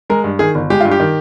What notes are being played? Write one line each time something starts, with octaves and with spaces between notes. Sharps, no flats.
G#3 A#4
G2
D#3 G#4
G1
G#3 G4
G2 F4
G4
D#3